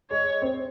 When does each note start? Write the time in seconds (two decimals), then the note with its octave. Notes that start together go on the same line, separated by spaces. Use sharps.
0.10 G#3 C#5
0.42 C4